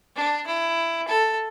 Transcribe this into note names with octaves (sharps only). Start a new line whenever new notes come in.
D4
E4
A4